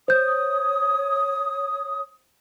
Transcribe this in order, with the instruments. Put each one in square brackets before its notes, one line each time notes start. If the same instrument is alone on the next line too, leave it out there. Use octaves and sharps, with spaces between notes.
[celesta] C5 G6 [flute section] C#5 D#6